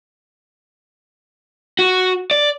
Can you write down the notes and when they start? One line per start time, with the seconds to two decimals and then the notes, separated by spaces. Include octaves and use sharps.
1.79 F#4
2.31 D5